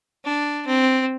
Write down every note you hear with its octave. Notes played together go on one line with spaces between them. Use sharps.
D4
C4